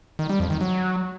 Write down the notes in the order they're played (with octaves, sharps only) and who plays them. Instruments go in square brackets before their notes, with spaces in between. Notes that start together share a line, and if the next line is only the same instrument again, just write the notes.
[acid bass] D#3
G3
F2
D#3
F#3